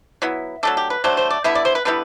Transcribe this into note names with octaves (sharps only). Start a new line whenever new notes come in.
F#3 B3 E4
F#3 A3 D4 A4
G4
B4
F#3 A3 D4 C5
C5
D5
D3 G3 B3 E4 E5
D5
C5
B4
D3 G3 B3 E4 B4